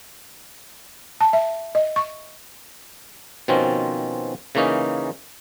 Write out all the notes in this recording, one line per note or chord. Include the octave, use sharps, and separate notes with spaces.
A5
E5
D#5
C#6
B2 D#3 F3 C4 C#4
C#3 E3 A#3 C#4 D#4